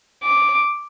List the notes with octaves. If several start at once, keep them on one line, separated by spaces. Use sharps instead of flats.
D6